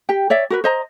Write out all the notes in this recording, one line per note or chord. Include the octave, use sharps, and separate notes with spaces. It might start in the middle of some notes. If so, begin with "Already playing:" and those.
G4 G5
C#5 D5 E5
F#4 A#4 B4
C5 D#5 A#5